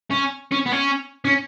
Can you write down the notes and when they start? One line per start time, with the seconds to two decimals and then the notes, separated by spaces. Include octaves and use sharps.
0.11 C#4
0.52 C#4
0.66 B3
0.72 C#4
1.25 C#4